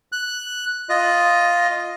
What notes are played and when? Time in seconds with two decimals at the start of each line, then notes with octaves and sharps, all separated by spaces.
0.12 F#6
0.89 F4 D#5